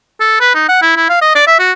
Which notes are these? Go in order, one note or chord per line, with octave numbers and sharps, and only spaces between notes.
A4
B4
D#4
F#5
E4
E4
F5
D#5
D5
E5
F#4